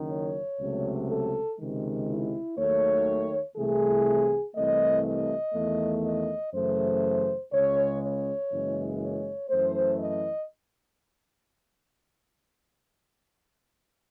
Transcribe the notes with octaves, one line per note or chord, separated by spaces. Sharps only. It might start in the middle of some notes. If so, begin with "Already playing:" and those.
Already playing: F#1 F#2 D#3
C#5
C#2 C3 F#3 A3
A4
C#2 C3 D#3 G#3
E4
D#2 D#3 F#3 A3 C#5
C2 C3 E3 A3 G#4
C2 C3 E3 A3 D#5
D#5
E2 D#3 A3
D#5
F#2 C#3 E3 A3 C5
C#2 C#3 G#3 C#5
C#5
F#1 F#2 E3 G#3
C#5
F#2 E3 A3 C5
D#5